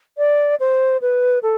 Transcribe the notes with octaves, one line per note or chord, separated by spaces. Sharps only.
D5
C5
B4
A4